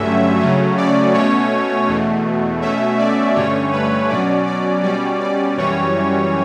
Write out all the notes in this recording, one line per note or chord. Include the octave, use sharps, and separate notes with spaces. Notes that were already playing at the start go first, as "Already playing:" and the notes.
Already playing: G2 D3 F#3 A3 C#4 E5
C#3 F#3 A3 C#4
D5
B2 A3 C#4 C#5
E2 B2 A3
B2 A3 C#4 E5
D5
G2 D3 A3 C#4 C#5
B4
B2 F#3 C#4 D5
D5
B2 G3 C#4 D5
D5
F#2 E3 G3 C#4 C#5